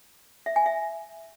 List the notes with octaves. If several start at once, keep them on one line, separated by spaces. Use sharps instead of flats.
E5
G#5
E5